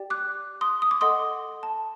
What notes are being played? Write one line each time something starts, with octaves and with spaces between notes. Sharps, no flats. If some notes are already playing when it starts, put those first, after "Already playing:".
Already playing: G4 D5 G5
D6 F#6
C6 D#6
D#6
D6
A4 D#5 F#5 C6 D#6
A5